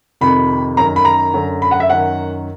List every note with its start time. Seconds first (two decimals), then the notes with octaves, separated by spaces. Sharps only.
0.21 F2 C3 D#3 B5
0.77 F#2 A#5
0.81 D#3
0.96 B5
1.05 A#5
1.34 F#2 D3
1.62 B5
1.71 F#5
1.80 E5
1.90 F#2 D#3 F#5